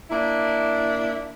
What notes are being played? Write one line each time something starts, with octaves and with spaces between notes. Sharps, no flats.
A#3 D4 E4